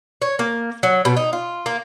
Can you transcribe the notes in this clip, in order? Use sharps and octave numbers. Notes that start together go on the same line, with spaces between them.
C#5
A#3
F#3
B2
D#4
F4
A#3